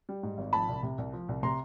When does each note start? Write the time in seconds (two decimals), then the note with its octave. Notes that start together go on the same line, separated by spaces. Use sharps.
0.09 G3
0.23 G#2
0.38 G#1
0.53 F3 A5 B5
0.69 C2
0.83 C3
0.98 C2
1.13 F3
1.29 C2
1.43 C3 A#5 C6